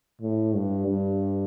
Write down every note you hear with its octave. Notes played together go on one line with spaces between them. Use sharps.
A2
G2
G2